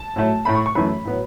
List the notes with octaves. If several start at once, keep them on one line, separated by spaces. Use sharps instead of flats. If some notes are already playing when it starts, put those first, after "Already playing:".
Already playing: A5
A2 F#3 A3
A2 A3 B5
C#6
C#6
F#2 E3 A3 B5
A2 F#3 B3